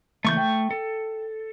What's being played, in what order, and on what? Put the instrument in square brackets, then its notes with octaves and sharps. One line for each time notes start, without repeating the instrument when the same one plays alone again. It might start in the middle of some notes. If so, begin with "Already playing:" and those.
[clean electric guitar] C#2 E3 A#3 [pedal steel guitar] A3 C#6 G6
[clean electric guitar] G5
[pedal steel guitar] A4